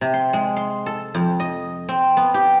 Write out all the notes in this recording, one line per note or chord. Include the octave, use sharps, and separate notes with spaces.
C3
C6
G#3
C6
A4
F2
D#5
C4
B3
G4